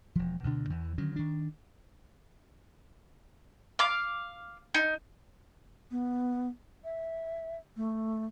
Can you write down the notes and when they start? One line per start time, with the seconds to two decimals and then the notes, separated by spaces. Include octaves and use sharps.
0.15 E1 F3
0.43 D2 B2 D3 D4
0.70 E2 E3
0.98 D3 D#3 F#3 C#4
1.16 D#3 D4
3.79 F5 D6
4.74 D#4
5.91 B3
6.84 E5
7.76 A3